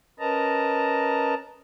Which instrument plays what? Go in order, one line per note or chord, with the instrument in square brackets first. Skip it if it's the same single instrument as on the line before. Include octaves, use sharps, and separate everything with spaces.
[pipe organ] C#4 A#4 B4 D#5 A5 A#5